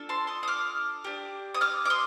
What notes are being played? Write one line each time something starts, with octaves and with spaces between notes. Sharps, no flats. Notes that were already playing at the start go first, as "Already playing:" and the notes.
Already playing: D4 F4 A4
A5 C6
C6 D#6
D#6
D6 F6
D4 G4
D#6
D6 F6
D6
C6 D#6